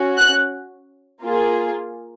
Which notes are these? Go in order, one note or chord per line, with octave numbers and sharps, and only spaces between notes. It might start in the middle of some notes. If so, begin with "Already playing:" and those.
Already playing: C#4 F#4
F#6
A#3 F4 G#4